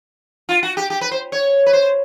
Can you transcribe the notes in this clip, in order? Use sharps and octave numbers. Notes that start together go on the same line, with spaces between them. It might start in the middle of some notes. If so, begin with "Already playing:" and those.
F4
F#4
G4
G4
B4
C5
C#5
B4
C5